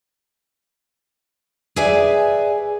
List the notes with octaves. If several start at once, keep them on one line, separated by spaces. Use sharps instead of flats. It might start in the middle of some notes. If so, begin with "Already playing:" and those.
G#4 B4 D5 E5 G#5